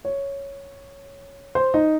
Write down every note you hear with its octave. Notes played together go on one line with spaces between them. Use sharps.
C#5
C5
D#4